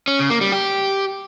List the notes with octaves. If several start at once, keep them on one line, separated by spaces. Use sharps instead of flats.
C#4
C#3
A#3
G3
G4